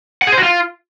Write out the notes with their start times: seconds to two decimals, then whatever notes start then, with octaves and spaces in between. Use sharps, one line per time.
0.22 F#5
0.27 G#4
0.32 C5
0.38 F#4
0.43 F4